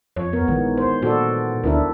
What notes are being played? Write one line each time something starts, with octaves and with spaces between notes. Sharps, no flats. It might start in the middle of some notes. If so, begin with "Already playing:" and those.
F2 C#5
B3 A#4
A#1 D#3 E3 G#3
C5
A#2 F#4 A4 D5
D2 D4 E4 A#4